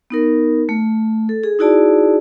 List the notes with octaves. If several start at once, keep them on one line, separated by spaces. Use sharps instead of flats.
B3 D#4 A#4
A3
A4
G#4
D#4 E4 F#4 G#4 D5 A5